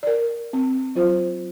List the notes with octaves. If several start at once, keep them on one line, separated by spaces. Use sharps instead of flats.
A#4 D5
C4
F#3 F4 C5